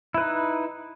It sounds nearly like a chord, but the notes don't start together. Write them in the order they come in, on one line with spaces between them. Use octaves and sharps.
E4 B4 D#4